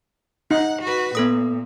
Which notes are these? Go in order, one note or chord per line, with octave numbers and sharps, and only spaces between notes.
D#4 F#5
F#4 B4
A#2 B3 A4 D#6